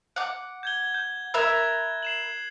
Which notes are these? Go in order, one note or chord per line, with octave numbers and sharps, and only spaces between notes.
F#5 D6
G6 G#6 G7
G6
A#4 E5 B5 F#6 G#6
C7 E7 F#7